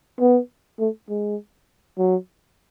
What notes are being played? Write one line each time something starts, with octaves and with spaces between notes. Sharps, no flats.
B3
A3
G#3
F#3